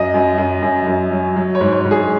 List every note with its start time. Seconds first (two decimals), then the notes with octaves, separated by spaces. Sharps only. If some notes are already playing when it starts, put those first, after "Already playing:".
Already playing: F#2 D#5
0.14 F#2
0.38 F#2
0.62 F#2
0.87 F#2
1.11 F#3
1.36 F#3
1.55 C#5
1.61 G#2
1.72 C#5
1.85 G#2
1.91 G#4